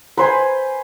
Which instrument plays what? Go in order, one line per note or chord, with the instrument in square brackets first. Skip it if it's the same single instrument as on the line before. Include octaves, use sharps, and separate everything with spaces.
[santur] B4 C5 G#5